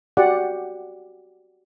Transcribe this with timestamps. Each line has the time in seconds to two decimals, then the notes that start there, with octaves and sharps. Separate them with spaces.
0.17 F#4 G4 D5 F#5